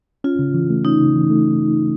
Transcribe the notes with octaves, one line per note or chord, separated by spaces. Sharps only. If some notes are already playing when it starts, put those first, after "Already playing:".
C#4 F4
C#3
E3
A3
C#4 D#4
C#3
E3
A3